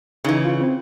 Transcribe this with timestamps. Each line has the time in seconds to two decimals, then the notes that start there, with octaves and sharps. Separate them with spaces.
0.24 C#3 E3 D#4
0.44 F4
0.61 C4